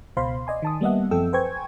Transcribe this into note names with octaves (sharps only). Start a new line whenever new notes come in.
C#2 B2 C5 F5 B5 C6
D5 D#5 G#5 C6
D#3 A5 D#6
G3 A#3 B3 D#5 E5 F#5
F#2 F3 C4 A4 G5 E6
B4 C5 G5 G#5 C#6 G#6